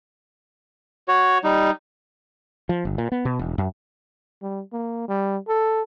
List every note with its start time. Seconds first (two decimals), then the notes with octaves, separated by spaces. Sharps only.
1.08 F#4 C#5
1.44 G3 D#4
2.69 F3
2.85 G1
2.98 A#2
3.12 B3
3.25 B2
3.39 E1
3.58 F#2
4.42 G3
4.73 A#3
5.08 G3
5.48 A4